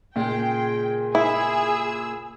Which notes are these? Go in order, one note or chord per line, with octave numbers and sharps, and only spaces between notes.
A#2 C#3 G#3 G5
E4 G#4 E6